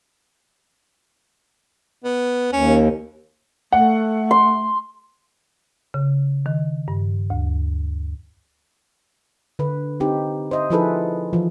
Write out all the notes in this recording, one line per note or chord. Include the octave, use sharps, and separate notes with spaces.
B3
D#2 C#4
A3 F#5
C6
C#3
D#3
G2
D2
D3 B4
C4 D#4 G4
C5 D#5 E5
F3 D#4 E4 G#4 A4 B4
E3 F3